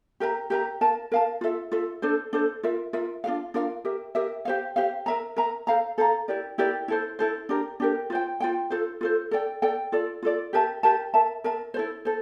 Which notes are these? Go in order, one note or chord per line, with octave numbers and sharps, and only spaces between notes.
G4 A#4 E5 A#5
G4 A#4 E5 A#5
A#4 F5 A5
A#4 F5 A5
F4 A4 E5
F4 A4 E5
D4 A4 C5
D4 A4 C5
F4 A#4 E5
F4 A#4 E5
D4 F4 A#4 F5
D4 F4 A#4 F5
G4 A#4 E5
G4 A#4 E5
G4 C5 F5
G4 C5 F5
A#4 E5 A#5
A#4 E5 A#5
A4 C5 F5 A#5
A4 C5 F5 A#5
E4 G4 A#4 D5
E4 G4 A#4 D5
E4 A4 C5
E4 A4 C5
D4 G4 A#4
D4 G4 A#4
F4 C5 G5
F4 C5 G5
F4 A4 C5
F4 A4 C5
A4 D5 G5
A4 D5 G5
F4 A4 D5
F4 A4 D5
G4 A#4 E5 A5
G4 A#4 E5 A5
A#4 E5 A5
A#4 E5 A5
C5
E4 A4
A4 C5